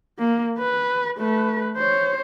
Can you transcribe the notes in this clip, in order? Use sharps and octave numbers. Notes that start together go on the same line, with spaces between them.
A#3
B4
A3 B4
C5 C#5